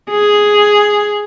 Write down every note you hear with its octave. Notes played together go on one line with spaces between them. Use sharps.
G#4